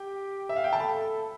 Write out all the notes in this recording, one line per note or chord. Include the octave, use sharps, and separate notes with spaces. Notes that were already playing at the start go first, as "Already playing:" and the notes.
Already playing: G4 G5
E5
F5
G5
A5
A4 B5